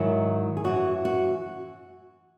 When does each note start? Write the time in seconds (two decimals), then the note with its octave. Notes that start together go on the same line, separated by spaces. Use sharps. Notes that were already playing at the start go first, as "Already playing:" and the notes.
Already playing: G#2 D#3 F#3 E4
0.57 G#4
0.64 F#2 E3 F#4
1.05 F#4